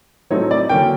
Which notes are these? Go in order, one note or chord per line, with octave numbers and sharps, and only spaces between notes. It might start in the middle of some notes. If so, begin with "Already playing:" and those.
A2 F#3 A3 C4 D#4 C#5
D5
D3 F#3 A#3 C#4 G5